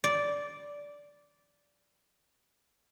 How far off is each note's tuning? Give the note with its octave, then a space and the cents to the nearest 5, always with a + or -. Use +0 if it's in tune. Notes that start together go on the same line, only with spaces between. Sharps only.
D5 -10